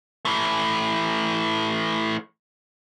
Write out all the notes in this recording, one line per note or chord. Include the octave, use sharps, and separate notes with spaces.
E3 A3